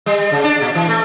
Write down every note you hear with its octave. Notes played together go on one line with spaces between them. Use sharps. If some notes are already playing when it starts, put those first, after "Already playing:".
G3
C#3
D4
A#2
E3
A3